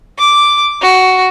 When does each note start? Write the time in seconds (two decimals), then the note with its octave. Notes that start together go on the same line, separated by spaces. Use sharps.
0.18 D6
0.82 F#4